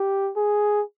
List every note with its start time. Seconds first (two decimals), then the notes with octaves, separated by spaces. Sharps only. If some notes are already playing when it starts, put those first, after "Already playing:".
Already playing: G4
0.36 G#4